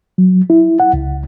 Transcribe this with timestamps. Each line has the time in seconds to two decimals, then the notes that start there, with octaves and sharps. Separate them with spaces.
0.18 F#3
0.50 E4
0.80 F#5
0.93 C#2